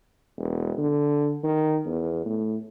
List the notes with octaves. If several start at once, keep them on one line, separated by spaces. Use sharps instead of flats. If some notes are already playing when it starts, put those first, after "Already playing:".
E1
D3
D#3
E2
A2